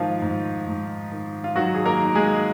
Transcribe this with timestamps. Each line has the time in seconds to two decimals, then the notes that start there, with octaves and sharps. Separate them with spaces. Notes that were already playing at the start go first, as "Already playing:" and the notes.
Already playing: G#2 D#3 F3 F4
0.22 G#2
0.67 G#2
1.12 D#3
1.44 F4
1.55 D#3 F#3 F#4
1.74 G#4
1.85 A#3 A#4
2.00 D#3
2.15 G#3 G#4